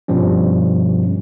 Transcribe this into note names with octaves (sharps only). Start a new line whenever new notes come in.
G2 B2 F3 G3 C#4